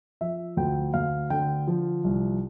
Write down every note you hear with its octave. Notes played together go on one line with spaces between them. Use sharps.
F3 E5
D2 G5
D2 F5
D3 G5
F3
C2